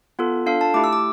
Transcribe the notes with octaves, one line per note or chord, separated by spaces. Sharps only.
B3 F4 A4
D4 F4 A4 F5
A5
A3 E4 G4 D6
E6
D6